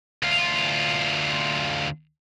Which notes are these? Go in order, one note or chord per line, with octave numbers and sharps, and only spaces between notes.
D2 F4